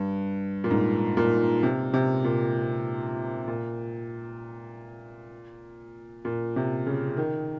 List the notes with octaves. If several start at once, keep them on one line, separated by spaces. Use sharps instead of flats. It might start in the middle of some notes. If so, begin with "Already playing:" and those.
Already playing: G2
A#2
G#2
A#2
C3
C3
A#2
A#2
A#2
C3
C#3
D#3